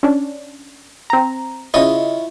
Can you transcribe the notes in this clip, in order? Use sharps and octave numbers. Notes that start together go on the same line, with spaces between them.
C#4 D4
C4 A#5
C#3 E4 F4 C#5 D#5